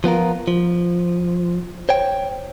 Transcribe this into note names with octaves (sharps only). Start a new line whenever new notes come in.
F3 B3 F4 A#4
F3
C5 C#5 G5